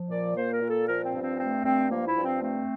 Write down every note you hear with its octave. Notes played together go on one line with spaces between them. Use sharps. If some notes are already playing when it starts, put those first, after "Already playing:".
Already playing: F3
A#2 D5
A#3 C5
A#4
A#2
A4
F3 A#4
C4
G2
C4
A3 C4
G2 C4
F3 A#3
E4
G2
C4
A3 C4